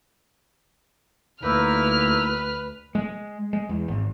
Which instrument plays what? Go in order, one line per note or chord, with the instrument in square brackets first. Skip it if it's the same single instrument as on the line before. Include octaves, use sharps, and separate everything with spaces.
[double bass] D2 [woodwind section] A#3 D#4 E4 [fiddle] B4 [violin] F6
[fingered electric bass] G#3
G#3
E2
G#1